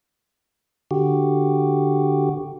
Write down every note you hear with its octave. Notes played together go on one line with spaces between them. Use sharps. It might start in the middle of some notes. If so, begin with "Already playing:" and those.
D3 F#4 G4